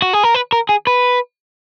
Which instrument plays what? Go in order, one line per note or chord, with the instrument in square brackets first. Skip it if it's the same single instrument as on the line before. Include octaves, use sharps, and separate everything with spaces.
[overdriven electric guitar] F#4
G#4
A#4
B4
A#4
G#4
B4